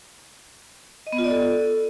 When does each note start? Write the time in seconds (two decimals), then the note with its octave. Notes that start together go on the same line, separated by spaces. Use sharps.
1.07 D#5
1.12 B3
1.18 F4
1.24 D5
1.30 A4